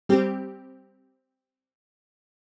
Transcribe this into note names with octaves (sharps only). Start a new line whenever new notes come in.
G3 C4 G4